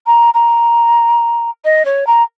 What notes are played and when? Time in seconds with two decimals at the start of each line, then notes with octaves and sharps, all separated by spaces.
0.07 A#5
0.34 A#5
1.65 D#5
1.85 C#5
2.07 A#5